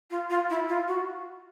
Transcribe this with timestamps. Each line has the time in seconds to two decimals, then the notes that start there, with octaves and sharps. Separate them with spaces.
0.10 F4
0.29 F4
0.49 E4
0.68 F4
0.87 F#4